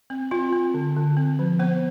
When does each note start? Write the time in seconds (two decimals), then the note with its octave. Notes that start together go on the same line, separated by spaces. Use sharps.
0.10 C4
0.31 C4 F4
0.53 C4
0.74 D3
0.96 D3
1.17 C4
1.39 F3
1.59 B3 C5